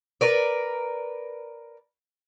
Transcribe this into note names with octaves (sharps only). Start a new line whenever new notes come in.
A#4 B4 D5